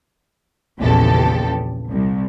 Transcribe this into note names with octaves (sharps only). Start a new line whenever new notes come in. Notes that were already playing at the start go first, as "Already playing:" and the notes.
A#1 E2 C#3 G4 A4
C2